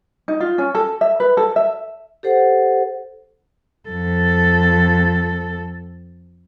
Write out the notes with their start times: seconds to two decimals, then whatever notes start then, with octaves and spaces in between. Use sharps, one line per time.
0.28 D#4
0.40 F4
0.58 C#4
0.75 A4
1.01 E5
1.20 B4
1.37 A4
1.56 E5
2.23 G4 A4 C5 F#5
3.89 F2 A4